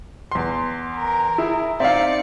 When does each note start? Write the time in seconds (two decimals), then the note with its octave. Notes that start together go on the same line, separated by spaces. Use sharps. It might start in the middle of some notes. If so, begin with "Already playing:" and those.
0.31 E2 C6
0.96 A#4
1.38 E4 G#4
1.80 C4 D#4 D5 E5 F5 C#7